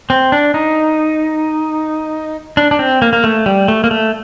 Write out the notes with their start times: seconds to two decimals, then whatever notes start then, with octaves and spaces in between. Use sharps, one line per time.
0.10 C4
0.32 D4
0.54 D#4
2.57 D4
2.71 D4
2.79 C4
3.02 A#3
3.13 A#3
3.24 A3
3.46 G3
3.68 A3
3.84 A#3
3.91 A3